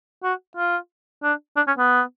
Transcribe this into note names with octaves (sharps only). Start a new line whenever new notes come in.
F#4
F4
D4
D4
C#4
B3